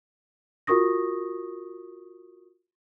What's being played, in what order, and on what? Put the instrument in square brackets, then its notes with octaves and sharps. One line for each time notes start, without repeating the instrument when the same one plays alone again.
[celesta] F4 F#4 A#4 C#6 D#6 A#6